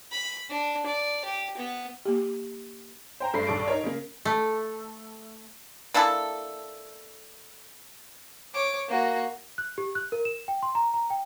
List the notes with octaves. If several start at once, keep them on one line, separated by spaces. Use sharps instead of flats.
B5
D4
D5
G4
B3
A#3 G4
C5 G5 A#5
G2 A3 C5 B5 C7
B1 G2 A4 D5 C#6 D7
D#4 A#4 C#5
C#3 A#3
A3
A#3 D4 E4 A4
C#5 D6
A#3 F#4
F#6
G4
F#6
A#4
E7
G5
C6
A#5
A#5
G5